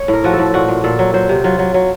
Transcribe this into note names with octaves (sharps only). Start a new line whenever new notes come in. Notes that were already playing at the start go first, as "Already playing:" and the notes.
Already playing: C#5
A2
A#4
F3 F#4
A4
A2
A#2 F#4
A#2
A#2 A4
F#3
F#3 C5
C3
F#3 F4
F#3
F#3